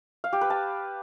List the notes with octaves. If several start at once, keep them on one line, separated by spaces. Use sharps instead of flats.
F5
G4
B4
A5